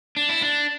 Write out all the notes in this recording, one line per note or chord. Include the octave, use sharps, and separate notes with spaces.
D4
E4
D4